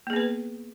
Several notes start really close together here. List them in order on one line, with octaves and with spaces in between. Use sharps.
A#3 G#4 B3 B4